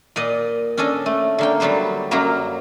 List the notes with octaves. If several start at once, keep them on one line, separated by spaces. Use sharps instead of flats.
A#2 D5 D#5
C#4 D4 A4 D#5
A3
D3 A#3 G5
D3 F#3 G3 B3 C5
F#2 F#3 A#3 A#5